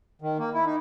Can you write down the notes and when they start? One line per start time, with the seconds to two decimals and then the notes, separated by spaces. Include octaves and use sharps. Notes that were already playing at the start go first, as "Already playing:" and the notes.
0.22 D#3
0.39 A#3
0.54 E4
0.66 D#4